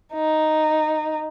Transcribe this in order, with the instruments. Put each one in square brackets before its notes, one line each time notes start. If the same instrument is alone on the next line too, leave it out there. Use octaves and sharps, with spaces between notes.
[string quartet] D#4